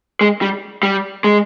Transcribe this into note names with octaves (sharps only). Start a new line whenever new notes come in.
G#3
G3
G3
G#3